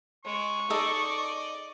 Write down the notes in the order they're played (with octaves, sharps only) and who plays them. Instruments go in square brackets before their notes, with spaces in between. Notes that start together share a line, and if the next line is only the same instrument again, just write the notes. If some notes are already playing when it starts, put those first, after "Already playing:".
[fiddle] G#3 [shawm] C#6
[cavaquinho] D#4 G#4 A4 [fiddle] D5 D#5